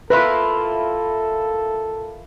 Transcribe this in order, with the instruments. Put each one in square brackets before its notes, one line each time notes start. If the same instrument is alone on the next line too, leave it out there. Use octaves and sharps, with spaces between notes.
[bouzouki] A#3 E4 F4 [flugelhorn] A4 [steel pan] B4